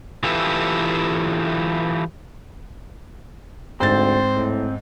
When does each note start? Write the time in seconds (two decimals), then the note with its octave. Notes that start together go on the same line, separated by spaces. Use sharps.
0.24 E3 F4 G4 A4 B4 E5
3.80 D2 G#2 C4 C5 A6
4.35 A2